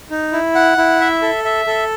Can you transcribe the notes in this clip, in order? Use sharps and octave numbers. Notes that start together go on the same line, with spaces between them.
D#4
E4
F#5
E4
E5
A4
E5
A4